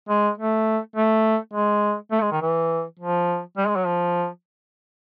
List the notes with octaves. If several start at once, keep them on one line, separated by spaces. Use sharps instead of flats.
G#3
A3
A3
G#3
A3
G#3
D#3
E3
F3
G3
G#3
F#3
F3